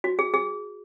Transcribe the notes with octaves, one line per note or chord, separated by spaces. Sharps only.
F#4
G#4
G#4